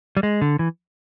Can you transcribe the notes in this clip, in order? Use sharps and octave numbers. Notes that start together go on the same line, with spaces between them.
G3
G#3
D3
E3